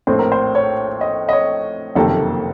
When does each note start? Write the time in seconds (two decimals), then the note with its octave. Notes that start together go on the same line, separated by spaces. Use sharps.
0.07 A#1 A2 A3 C4 C5
0.19 A#4
0.32 C5
0.55 C#5
1.01 D#5
1.29 D#5
1.33 C#5
1.95 F#1 F2 C3 D#3 A#3 A4